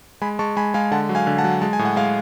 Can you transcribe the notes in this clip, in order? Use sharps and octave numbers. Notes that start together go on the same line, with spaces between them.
G#3 G#5 B5
G#3 A5 C#6
G#3 G#5 B5
G#3 F5 G#5
D3 F#5 A5
F#3
F5 G#5
D3
F#5 A5
F#3
G#3 A5
G#5
A2
F#5
G#3 F5 G#5